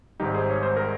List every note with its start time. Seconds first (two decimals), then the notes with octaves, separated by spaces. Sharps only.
0.20 G#1 G#2 D#3 G3 D#4 G4
0.34 G#4 C5
0.50 C#5
0.63 C5
0.77 A#4